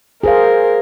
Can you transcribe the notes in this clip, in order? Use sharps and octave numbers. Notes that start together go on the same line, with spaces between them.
G#4 A#4 C5 F5